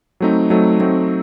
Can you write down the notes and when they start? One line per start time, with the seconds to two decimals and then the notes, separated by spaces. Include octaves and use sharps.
0.20 F#3 A3 C4 D#4
0.50 F#3 A3 C4 D#4
0.80 F#3 A3 C4 D#4